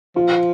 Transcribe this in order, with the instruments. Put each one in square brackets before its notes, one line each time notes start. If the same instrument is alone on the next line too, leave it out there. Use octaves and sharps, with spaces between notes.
[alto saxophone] F3 [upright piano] F4